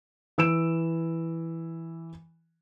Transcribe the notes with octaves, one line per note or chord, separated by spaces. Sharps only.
E3 E6 D7 E7